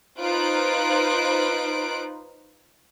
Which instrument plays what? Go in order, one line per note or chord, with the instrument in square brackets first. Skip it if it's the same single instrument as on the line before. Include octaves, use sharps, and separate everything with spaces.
[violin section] D#4 F4 B4 C5 F#6 D7